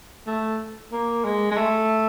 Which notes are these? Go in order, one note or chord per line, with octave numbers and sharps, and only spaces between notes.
A3
A#3
G#3
G#3
A3